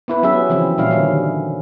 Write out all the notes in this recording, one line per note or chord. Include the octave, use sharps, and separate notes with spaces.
B3 E4 B4
F#3 B3 C#4 G4 G#4 E5
C#3 E3 F3 C4
A#2 G3 C#4 E4 F5
D3 D#3 F#3 G3